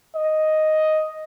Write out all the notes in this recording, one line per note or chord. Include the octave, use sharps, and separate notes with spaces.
D#5